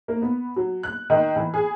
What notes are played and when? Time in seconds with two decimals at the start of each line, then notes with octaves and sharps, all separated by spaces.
0.08 A#3
0.22 B3
0.56 F#3
0.83 F#6
1.10 D#3
1.36 E3
1.54 G#4